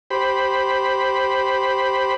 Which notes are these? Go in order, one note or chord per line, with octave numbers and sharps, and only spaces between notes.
G4 C5 B5